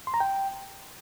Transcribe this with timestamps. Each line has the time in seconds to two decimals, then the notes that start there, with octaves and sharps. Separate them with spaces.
0.07 C6
0.14 A#5
0.20 G5